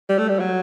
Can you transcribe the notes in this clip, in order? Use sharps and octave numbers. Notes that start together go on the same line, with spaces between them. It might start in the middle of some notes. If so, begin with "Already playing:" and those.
G3
A3
G3
F#3